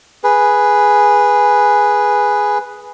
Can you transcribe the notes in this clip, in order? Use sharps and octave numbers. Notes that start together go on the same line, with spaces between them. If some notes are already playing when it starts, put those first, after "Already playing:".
G#4 B4